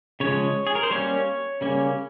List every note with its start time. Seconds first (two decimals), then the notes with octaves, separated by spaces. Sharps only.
0.20 C#3 F3 G#3 C#5
0.67 G#4
0.75 A#4
0.83 C5
0.91 G3 A#3 C#4 C#5
1.61 C#3 G3 A#3 C#4